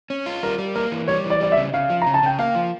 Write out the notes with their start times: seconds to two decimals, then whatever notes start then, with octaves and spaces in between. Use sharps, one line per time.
0.10 C#4
0.26 F4
0.43 G3 A#4
0.58 G3
0.75 A#3 A#4
0.92 E3
1.08 G3 C#5
1.24 E3
1.30 D5
1.40 G3 D5
1.52 E5
1.57 C#3
1.73 C#3 F5
1.90 F3
2.02 C#3 A#5
2.14 A5
2.23 C#3 G5
2.39 A#3 F5
2.55 F3